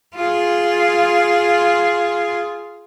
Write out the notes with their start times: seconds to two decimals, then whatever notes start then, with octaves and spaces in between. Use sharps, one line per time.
0.15 F4 G#4